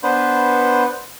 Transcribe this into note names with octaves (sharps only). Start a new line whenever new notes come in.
B3 D4 B4 C5